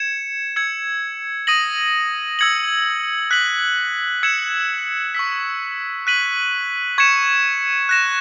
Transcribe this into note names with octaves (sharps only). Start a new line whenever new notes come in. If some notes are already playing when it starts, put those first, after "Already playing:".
Already playing: G#6 C#7 E7
E6 G#6 C#7
D#6 A#6 D#7 F#7
E6 G#6 C#7 F#7
F#6 B6 F#7
E6 G#6 C#7 E7
C#6 E6 B6
F#6 B6 D#7 F#7
C#6 G#6 C#7 E7
F#6 A#6 E7